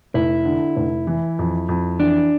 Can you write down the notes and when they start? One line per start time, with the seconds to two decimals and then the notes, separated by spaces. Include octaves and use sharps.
0.14 F1 E4
0.45 D3
0.77 F1
1.07 E3
1.39 F2
1.69 F2
2.00 E3 D4